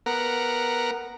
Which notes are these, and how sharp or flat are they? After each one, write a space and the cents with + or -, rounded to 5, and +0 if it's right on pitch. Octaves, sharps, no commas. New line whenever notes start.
B3 -10 A#4 +0 F#5 +0